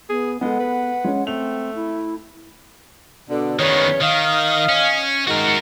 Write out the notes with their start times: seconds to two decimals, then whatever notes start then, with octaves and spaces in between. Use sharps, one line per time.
0.10 B3 G#4
0.41 G#3 B3 A4 F#5
0.60 B4
1.04 G#3 C#4
1.27 A3 C4 F7
1.75 E4
3.29 B2 D3
3.59 E2 D#3 B3 C#4 C#5
4.01 D#3 D#5 F5
4.69 C#4
5.27 D#3 G#3 F#4 A#4